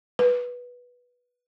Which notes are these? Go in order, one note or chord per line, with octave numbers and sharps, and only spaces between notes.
B4